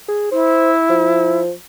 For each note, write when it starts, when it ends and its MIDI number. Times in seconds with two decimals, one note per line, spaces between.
0.09 0.31 68
0.32 1.40 64
0.32 0.72 72
0.90 1.52 53